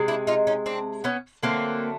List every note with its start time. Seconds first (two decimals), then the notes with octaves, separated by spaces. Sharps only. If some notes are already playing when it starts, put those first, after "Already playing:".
Already playing: C3 G#3
0.08 D4 E4
0.27 D#4 F4
0.47 C#4 D#4
0.66 C4 D4
1.04 B3 C#4
1.43 D3 F#3 A3 A#3 C4